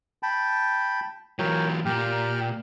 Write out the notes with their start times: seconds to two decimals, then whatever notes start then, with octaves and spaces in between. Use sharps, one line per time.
0.23 G5 A5 B5
1.39 E3 F#3 A#4 C#5 G5
1.85 A#2 G4 G5 F6